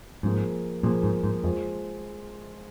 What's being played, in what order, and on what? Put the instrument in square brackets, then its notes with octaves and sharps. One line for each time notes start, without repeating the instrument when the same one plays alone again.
[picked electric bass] G#2 [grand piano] F3 A#3 G#4
[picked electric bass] A#2 [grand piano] F3 A#3 G#4
[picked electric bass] G#2
G#2
[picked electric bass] F2 [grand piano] G#3 F4 C5